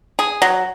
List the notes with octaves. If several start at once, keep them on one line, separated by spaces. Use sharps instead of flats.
G#4
F#3